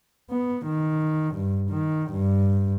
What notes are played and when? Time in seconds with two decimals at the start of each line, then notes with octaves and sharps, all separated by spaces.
0.31 B3
0.66 D#3
1.36 G2
1.70 D#3
2.11 G2